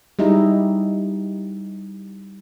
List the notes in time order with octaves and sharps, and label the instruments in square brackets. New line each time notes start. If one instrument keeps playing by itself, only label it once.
[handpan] G3 G#3 D#4 E4